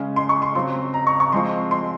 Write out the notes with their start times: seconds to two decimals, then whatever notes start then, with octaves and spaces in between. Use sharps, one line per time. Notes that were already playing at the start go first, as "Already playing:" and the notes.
Already playing: C#3 G#3 C#4
0.16 C6
0.29 C#6
0.42 C6
0.55 C#3 F#3 C4 C6
0.94 A#5
1.07 C#6
1.20 C#6
1.32 F3 G#3 C4 C6
1.71 C6